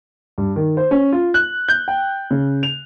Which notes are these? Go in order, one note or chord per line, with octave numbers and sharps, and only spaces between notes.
G2
D#3
C5
C#4
F4
F#6
G6
G5
C#3
F7